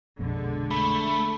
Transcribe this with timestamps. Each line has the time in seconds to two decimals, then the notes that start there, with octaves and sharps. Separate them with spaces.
0.19 A#1 F2 B2 D3 G#3
0.71 A3 B5